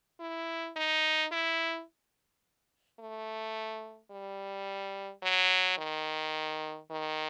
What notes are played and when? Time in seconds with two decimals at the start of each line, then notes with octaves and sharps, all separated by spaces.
0.20 E4
0.76 D#4
1.32 E4
3.00 A3
4.11 G3
5.23 F#3
5.78 D#3
6.91 D#3